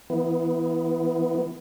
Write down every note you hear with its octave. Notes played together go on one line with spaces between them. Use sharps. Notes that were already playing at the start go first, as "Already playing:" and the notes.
E3 B3